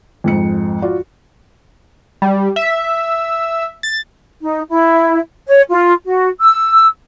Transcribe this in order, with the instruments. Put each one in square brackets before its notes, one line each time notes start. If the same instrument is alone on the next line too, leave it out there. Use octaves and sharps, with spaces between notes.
[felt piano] F2 G#2 C#7
F4 F#4 D5
[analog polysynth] G3
E5
A6
[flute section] D#4
E4
C#5
F4
F#4
E6